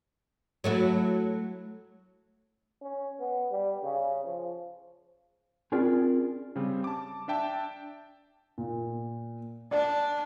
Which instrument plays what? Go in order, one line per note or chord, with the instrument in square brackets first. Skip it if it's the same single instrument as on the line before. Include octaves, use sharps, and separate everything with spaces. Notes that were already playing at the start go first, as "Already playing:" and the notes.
[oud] F#3 A3 E4
[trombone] C#4
B3
G3
C#3
F3
[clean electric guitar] C4 C#4 F4 G#4 A#4 D5
[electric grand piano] C#3 G3 C4
A5 D6
D4 E5 G5 A5
[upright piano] A#2
[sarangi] D4 [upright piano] D5